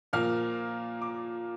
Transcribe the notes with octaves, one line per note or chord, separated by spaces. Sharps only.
A#2 F3 A#3 F6
D6